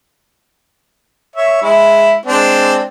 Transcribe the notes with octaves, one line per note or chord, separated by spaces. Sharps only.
C#5 E5
G#3 E4
G#3 C4 D4